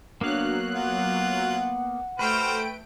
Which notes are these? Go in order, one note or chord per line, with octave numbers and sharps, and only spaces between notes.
F#3 A#3 B3 D4 F5 F#6
F4 F#5
A3 F#4 B4 C5 G5 F6 D7